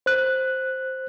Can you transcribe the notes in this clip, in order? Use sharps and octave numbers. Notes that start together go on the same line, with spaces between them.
C5 F#6